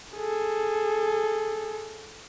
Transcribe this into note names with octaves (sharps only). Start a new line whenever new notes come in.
G#4 A4